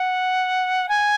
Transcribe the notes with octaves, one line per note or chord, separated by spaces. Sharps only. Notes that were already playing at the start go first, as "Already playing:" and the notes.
Already playing: F#5
G#5